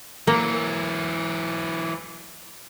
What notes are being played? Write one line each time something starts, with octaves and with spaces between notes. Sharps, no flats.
E3 F#3 A#3